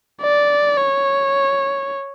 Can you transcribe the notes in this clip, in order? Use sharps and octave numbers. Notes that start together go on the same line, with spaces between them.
D5
C#5